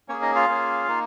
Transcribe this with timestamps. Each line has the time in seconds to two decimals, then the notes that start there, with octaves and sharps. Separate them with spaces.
0.09 A#3 C#4 G#4 C#5
0.22 D#4 D#5
0.35 F4 F5
0.48 A#3 C#4 G#4
0.87 A#3 D#4